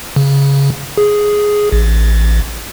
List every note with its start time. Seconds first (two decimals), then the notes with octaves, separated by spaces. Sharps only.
0.16 C#3
0.98 G#4
1.72 A1